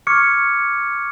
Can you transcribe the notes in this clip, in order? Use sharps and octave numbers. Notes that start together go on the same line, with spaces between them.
C#6 D6 F6 G#6 C#7